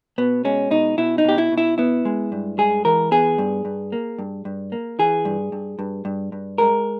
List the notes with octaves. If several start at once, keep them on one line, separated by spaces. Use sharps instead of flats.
B2 B3
G#3 C#4
B2 D#4
B2 E4
D#4
B2 G4
E4
B2
E4
B3 E4
G#3
G2
G#3 G#4
E3 A#4
B3 G#4
G2
G2
A#3
G2
G2
A#3
E3 G#4
G2
G2
G2
G2
G2
G#3 A#4